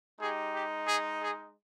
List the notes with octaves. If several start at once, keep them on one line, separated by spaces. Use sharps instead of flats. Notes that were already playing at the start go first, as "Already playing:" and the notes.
G#3 D#4 G4 G#4
G4
G#4
G#4